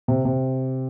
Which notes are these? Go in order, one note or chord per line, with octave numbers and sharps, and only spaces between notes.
C3
C3